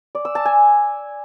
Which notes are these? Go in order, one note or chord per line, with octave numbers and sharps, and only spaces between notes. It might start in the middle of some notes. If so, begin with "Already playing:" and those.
D5
E6
A5
G#5